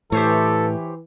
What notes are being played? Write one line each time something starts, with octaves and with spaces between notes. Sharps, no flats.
A2 E3 G4 A4 C5 C#5